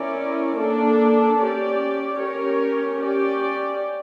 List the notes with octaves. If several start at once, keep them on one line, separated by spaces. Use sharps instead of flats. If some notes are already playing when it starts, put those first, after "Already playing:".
Already playing: C#4 E4 A#4 D5
A#3 D4 A4 D5
C#4 G4 D5
C#4 G4 A#4 C#5
C#4 G4 D5